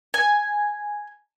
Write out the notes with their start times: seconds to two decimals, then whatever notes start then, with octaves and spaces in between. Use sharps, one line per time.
0.14 G#5